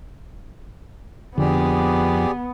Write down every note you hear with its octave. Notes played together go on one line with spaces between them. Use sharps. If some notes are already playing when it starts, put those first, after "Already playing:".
F2 D3 B3 G4 G#4 D5